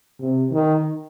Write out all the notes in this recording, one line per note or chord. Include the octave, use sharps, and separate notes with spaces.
C3
D#3